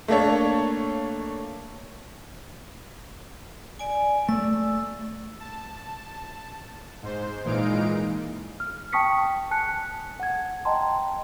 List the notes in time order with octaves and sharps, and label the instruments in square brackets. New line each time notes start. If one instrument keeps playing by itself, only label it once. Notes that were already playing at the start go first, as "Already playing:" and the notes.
[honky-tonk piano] A3 A#3 D4 A4 C#5
[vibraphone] D5 G#5
[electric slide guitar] A3 D5 [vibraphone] E6
[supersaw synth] A5
G#2 C5
A#2 E3 G#3 D#4 F5 D7
[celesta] F6
G5 A5 C#6 D#6 B6 C#7
G#5 A5 F#6 C#7
F#5 G#6
D#5 G5 A5 A#5 C6